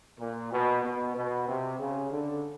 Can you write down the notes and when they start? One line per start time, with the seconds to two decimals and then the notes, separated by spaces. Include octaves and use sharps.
0.20 A#2
0.52 B2
0.84 B2
1.15 B2
1.48 C3
1.79 C#3
2.11 D3